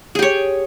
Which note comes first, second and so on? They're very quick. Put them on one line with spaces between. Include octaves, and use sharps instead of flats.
G#4 G4 C#5